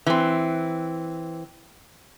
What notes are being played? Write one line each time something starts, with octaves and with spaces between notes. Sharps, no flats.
E3 C4